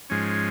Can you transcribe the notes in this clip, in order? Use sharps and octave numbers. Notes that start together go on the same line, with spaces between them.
G#2 F3 G#3 C#4